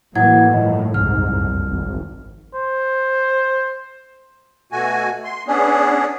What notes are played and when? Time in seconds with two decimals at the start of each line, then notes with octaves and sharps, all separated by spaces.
0.15 A2 E3 F#3 A#3 E4 F#5 G#6
0.53 G2 D#3 F3 D#5
0.94 F#1 C2 F2 G#2 F6
1.71 G#1
2.55 C5
4.72 B2 A3 F#4 G#5
5.24 C6
5.47 B3 C#4 D4 G#4